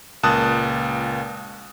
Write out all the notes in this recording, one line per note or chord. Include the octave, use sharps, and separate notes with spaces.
C#2 A#2 A5 D#6 F#6